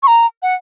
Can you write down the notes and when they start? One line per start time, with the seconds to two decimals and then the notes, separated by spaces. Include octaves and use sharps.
0.03 C#6
0.07 A#5
0.42 F#5